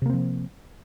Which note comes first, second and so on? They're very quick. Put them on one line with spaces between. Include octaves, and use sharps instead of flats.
C3 A#3 C4 F3